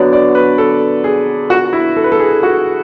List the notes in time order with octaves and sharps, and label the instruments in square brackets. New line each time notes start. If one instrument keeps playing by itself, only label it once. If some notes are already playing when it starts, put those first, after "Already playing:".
Already playing: [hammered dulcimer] D3 F#3 B3 [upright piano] D5
[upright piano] D5
B4
A4
G#4
F#4
E4
A4
B4
A4
G#4
F#4